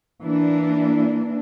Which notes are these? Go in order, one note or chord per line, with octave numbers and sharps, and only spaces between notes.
E3 A#3 D4